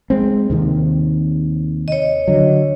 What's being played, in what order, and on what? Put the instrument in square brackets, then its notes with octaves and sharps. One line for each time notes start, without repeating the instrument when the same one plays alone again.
[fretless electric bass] G#3 C4
D#2 C3 D#3
[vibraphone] C#5 D#5
[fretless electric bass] D3 F#3